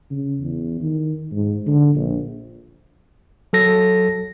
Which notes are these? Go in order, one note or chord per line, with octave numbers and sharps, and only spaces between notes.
C#3
E2
D#3
G#2
D3
A#1
F#3 A4 A#6